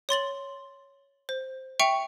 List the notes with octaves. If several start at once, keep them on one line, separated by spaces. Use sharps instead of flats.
C#5 C6 A6 F#7
C5
E5 G5 C#6 C#7 F7